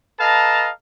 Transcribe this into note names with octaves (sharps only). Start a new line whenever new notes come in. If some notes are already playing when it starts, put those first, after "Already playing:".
A4 B4 D#5 F5 A5 A#5